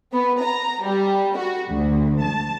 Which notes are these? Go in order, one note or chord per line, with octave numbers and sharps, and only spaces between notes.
B3
A#5
G3
F#4
D2
A5